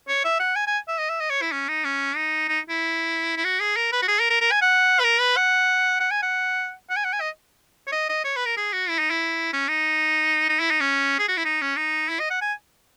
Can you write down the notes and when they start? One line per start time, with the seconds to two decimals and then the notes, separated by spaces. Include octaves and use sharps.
0.08 C#5
0.24 E5
0.39 F#5
0.56 G#5
0.67 G#5
0.88 E5
0.98 D#5
1.09 E5
1.20 D#5
1.30 C#5
1.41 E4
1.52 C#4
1.68 D#4
1.84 C#4
2.16 D#4
2.48 D#4
2.69 E4
3.36 E4
3.44 F#4
3.60 G#4
3.76 A#4
3.92 B4
4.02 F#4
4.08 G#4
4.19 A#4
4.30 A#4
4.41 A#4
4.51 G#5
4.62 F#5
4.99 B4
5.04 A#4
5.20 B4
5.36 F#5
6.00 F#5
6.11 G#5
6.22 F#5
6.90 F#5
6.96 G#5
7.04 F#5
7.13 G#5
7.21 D#5
7.87 C#5
7.92 D#5
8.09 D#5
8.24 C#5
8.36 B4
8.45 A#4
8.57 G#4
8.73 F#4
8.89 E4
8.99 D#4
9.10 E4
9.53 C#4
9.68 D#4
10.49 D#4
10.60 E4
10.70 D#4
10.80 C#4
11.19 G#4
11.28 F#4
11.37 E4
11.45 D#4
11.62 C#4
11.76 D#4
12.09 E4
12.19 D#5
12.30 F#5
12.41 G#5